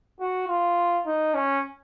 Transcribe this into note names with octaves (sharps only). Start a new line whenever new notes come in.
F#4
F4
D#4
C#4